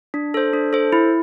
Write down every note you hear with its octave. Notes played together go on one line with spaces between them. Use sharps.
D4
A4 C5
D4
A4 C5
E4